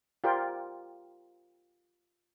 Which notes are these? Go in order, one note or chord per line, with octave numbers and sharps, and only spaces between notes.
F4 G4 A#4 C5 D5 G5